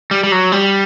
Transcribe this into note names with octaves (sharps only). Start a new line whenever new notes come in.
G3
G3
F#3
G3